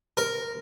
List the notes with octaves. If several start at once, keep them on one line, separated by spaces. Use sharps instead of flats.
A#4